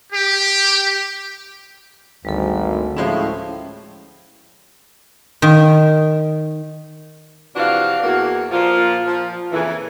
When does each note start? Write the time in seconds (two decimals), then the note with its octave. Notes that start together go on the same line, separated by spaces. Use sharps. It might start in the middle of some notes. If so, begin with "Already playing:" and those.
0.13 G4
2.25 G#1 D2 G3 A4
2.96 A2 F3 G#3 C#4 E4
5.42 D#3
7.56 C3 E3 F3 D4 F#4 F5
8.03 E2 A#3 F#4
8.51 A#2 F3 F4
9.05 F3
9.52 F2 A#2 C#3 E3